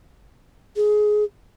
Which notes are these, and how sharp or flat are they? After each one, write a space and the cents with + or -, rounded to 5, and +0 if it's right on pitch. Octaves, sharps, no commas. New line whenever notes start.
G#4 +15